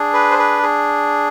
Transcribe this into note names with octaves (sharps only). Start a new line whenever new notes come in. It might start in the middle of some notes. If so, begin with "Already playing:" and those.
Already playing: D4 G#4
B4
C5
B4
G#4